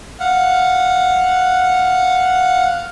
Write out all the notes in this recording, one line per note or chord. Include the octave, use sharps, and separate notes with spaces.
F5 F#5